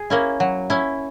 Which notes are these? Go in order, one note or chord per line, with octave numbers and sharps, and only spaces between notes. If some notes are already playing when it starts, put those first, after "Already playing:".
Already playing: G#4
A#3 C#4 E4
F#3
C#4 E4